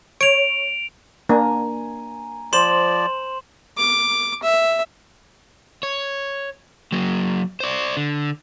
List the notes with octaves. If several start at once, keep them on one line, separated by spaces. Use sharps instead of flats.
C#5 D7 F7
A#3 D4 G#5 A#5
F3 C5 D5 C6 E7 F#7
D6
E5
C#5
F#3 A#3
C5 D5
D3